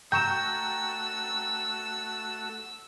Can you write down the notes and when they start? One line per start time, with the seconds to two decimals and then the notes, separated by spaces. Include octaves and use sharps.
0.12 A3 F#4 G5 A#5 C#6 E6 G6 E7